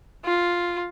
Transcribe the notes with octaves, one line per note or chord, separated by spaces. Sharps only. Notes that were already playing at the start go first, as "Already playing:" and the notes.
F4